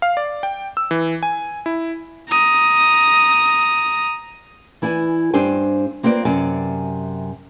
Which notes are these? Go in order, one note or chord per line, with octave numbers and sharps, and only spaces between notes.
F5
D5
G5
E6
E3
G#5
E4
A#5 D#6
E3 E4 D5 G#5
G2 C4 D4 G4 C5 G#5
A#3 C4 F4 B4 D5
F#2 C3 D5 G#5